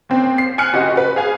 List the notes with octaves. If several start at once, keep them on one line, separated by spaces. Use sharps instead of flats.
D#2 C4
C7
G#5 F6 F#6 C#7
F#1 F#4 G4 D#5
B4
G#4 F5 G#5